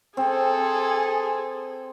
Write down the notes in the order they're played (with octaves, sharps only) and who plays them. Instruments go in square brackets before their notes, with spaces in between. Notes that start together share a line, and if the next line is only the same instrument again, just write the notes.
[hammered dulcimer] C4 [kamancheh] G#4 A4